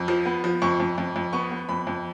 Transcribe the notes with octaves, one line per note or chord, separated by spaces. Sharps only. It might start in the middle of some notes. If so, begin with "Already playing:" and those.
Already playing: F2
F3
B3
F3
F2 C#6
F2
F2
F2
B3 C#6
B3
F2 B5
F2